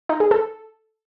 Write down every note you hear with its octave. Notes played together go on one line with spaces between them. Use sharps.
D#4
G#4
A4